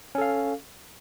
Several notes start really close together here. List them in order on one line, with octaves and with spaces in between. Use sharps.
C#4 A4 F5